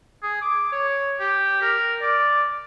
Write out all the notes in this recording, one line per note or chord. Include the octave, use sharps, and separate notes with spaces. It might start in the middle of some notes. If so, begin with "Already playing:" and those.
G#4
D6
C#5
G4
A#4
D5